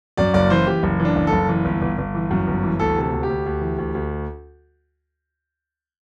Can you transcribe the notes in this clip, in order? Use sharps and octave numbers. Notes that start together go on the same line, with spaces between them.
F#2 D5
F#1 D5
E3 C5
E3 G4
F#1
E3
D4
F#1
A4
F#1
E3
G1
G1
G1
E3
F#2
G1
E3
D2 A4
C3 A4
D2
G4
D2
D2
E3
D2
D2